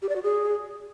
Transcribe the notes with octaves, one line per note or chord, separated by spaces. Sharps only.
G4
D5
F#4
G#4